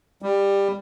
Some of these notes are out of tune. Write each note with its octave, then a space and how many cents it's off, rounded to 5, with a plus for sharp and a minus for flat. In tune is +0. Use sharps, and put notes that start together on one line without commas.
G3 +15